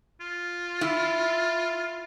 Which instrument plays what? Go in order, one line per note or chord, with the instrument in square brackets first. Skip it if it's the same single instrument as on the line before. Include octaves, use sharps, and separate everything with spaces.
[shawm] F4
[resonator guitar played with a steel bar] E4